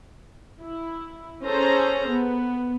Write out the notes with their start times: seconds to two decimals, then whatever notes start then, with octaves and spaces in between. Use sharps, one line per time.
0.62 E4
1.46 C#4 G#4 A4 C5 A#5
2.11 B3